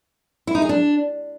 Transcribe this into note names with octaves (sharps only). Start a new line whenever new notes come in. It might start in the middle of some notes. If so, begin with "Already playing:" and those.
E4
D#4
G#4
D4